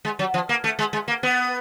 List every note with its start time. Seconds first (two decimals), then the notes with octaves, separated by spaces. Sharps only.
0.05 G#3
0.19 F#3
0.34 F3
0.49 A#3
0.64 A3
0.79 G#3
0.93 G#3
1.08 A#3
1.23 B3